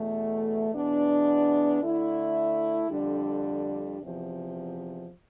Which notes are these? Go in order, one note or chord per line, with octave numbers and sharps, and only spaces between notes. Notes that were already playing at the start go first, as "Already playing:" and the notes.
Already playing: E2 B2 A3
E2 B2 B3 D4
D3 A3 E4
F2 D3 G3 D4
E2 C3 F3